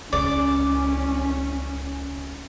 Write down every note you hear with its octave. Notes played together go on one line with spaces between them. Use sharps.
C#2 C#4 D5